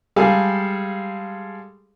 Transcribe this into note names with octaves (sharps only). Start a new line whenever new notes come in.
G3 G#3 G#4 A4 F5